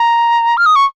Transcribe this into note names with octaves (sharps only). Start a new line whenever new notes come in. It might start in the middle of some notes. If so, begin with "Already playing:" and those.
Already playing: A#5
F6
D#6
C#6